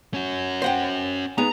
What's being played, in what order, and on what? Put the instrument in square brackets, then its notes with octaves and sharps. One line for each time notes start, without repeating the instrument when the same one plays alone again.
[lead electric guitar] C#4 F#4
[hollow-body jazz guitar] C5 F#5 G5
[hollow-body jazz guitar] G#3 B3 D#4 [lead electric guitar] A#5